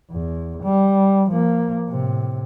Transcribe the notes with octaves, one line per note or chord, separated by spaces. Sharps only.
E2
G3
F3 A#3
A2 C3